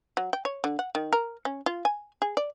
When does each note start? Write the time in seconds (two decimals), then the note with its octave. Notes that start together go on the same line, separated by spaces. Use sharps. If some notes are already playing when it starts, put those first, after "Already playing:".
0.17 F#3
0.33 G5
0.45 C#5
0.64 D3
0.79 F#5
0.95 D#3
1.13 A#4
1.45 C#4
1.66 F4
1.85 G#5
2.22 G#4
2.37 D5